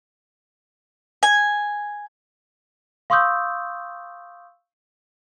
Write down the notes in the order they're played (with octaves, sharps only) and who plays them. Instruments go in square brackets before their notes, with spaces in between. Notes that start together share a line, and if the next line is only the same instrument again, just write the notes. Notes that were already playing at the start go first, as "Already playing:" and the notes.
[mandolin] G#5
[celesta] F5 C6 C#6 D#6 E6 G6